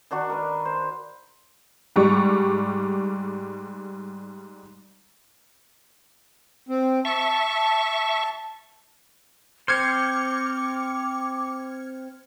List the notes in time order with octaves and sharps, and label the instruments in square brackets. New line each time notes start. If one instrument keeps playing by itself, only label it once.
[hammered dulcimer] D#3 D4 F#4 C#6
A#4 B4
C5
[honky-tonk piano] G#2 G3 C#6
[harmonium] C4
[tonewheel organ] E5 C#6 [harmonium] A5
[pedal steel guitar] C4 C5 [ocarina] D6 [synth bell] F6 G#6 C#7